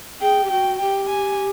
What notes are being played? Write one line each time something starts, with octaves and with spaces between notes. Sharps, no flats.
G#4 G5
G4
F#4 G5
G4 G5
G#5